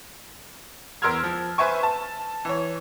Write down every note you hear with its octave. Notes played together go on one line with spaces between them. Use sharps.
E2 A#4 C6 E6 F6 G#6
F3
B4 C5 E5 G#5 C#6
A5
E3 C#5